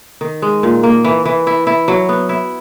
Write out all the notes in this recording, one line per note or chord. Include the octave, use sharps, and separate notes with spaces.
D#3
G#3
A#2
A#3
E3
E3
E4
E4
F#3
B3
E4